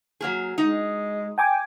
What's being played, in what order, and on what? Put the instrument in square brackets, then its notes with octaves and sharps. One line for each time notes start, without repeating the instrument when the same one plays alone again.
[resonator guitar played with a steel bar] F#3 A#3 G#4
[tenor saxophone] G#3 [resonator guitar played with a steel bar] D#4
[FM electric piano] G5 G#5 D6